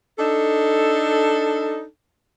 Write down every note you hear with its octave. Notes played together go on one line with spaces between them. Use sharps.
D4 D#4 A4